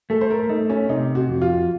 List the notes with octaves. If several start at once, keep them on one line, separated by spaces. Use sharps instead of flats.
A3 A4
C5
A#4
A3 D#4
C#4
C3 D#4
F#4
F2
F4